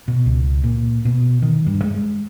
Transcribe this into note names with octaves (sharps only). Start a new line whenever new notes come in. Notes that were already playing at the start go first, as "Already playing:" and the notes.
B2
C#2
A#2
B2
D#3
G2
G#3